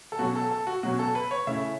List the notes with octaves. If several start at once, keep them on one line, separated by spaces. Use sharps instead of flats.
A4
B2 F#3 C#4 F#4
A4
A4
F#4
B2 F#3 C#4 F#4
A4
B4
C#5
C#3 A3 C#4 E4 E5